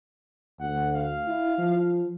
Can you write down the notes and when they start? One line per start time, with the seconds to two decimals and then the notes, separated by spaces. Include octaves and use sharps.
0.60 D2 F#5
0.95 F5
1.28 E4
1.58 F3